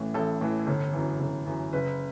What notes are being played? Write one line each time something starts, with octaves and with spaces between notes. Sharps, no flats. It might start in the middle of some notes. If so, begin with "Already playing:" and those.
Already playing: A1 A2 E3
A1 A4
A2 E3
G1
F#2 E3
G1
F#2 E3
F#1 B4